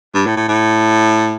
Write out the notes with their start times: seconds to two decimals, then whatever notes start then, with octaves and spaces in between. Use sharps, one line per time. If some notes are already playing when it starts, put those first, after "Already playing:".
0.14 G2
0.26 A2
0.37 A2
0.48 A2